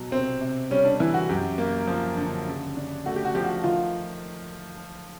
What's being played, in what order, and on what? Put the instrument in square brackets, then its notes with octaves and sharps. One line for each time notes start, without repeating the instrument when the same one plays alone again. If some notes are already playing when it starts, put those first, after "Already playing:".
Already playing: [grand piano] B2 F#3
[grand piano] C3 [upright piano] C4
[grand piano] C3
[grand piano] G3 [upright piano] C#4
[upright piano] D4
[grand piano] E3 [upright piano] E4
[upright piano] F#4
[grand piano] F#2 [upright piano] G4
[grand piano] A#3
F3
D3
C#3
D4
[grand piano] A3 [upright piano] F#4
[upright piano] G4
F#4
[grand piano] F3 [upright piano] G4
[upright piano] F#4
[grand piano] D#3 [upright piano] F4